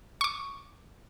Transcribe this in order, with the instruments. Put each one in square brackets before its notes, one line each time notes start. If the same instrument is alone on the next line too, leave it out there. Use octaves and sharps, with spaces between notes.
[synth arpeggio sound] C#6 D6